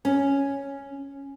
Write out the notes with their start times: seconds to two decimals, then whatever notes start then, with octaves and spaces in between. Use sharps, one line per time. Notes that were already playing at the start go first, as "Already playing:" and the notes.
0.05 C#4